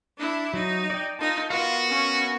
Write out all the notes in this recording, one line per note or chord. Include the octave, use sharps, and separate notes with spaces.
D4 E4
F#3 D#4
D5 G5
D#4 F4 A5
B3 F4 F#4 A#4 F5
C#4